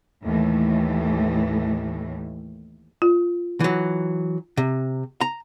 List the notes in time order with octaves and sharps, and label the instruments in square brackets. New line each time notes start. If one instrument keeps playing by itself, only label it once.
[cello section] D#2 A2 E3 A3
[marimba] F4
[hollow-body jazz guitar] E3 F#3
C3
A#5